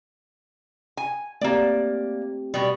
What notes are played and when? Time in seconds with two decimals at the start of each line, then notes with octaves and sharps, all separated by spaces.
0.97 G#5
1.41 A3 A#3 C4 G4 D5
2.54 B2 G3